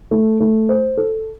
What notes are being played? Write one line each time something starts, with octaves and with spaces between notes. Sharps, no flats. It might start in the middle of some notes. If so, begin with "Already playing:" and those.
A3
A3
C5
A4